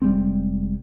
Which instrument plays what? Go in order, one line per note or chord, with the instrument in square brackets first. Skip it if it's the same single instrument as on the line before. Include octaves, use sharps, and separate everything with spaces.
[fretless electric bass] F1 G3 G#3 C4